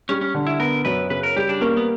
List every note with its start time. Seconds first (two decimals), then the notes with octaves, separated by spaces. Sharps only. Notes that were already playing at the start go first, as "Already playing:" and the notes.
0.09 G3 C#4
0.21 C#4
0.35 D3
0.47 E4
0.60 B3 A#4
0.85 F#2 B4
1.10 C#3 B4
1.23 A#4
1.36 G3 G4
1.49 D4
1.61 A#3 C#4
1.77 B3